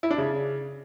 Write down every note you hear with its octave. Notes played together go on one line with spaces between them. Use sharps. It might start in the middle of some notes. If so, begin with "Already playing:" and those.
E4
D4
C#3